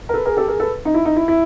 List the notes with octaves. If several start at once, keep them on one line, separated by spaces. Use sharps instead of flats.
A#4
A4 B4
G#4 A#4
G4 A4
G#4 A#4
A4 B4
D#4
E4
D#4
E4
E4